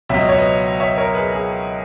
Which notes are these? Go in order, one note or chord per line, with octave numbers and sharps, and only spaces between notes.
C#2 B2 F#3 E5
D#5
C#5
B4 D#5
C#5 E5
A#4 C#5
G#4 B4
G#4